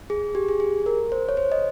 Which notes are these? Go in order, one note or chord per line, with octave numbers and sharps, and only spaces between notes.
G#4
G4
G#4
G#4
A#4
C5
C#5
C5
D#5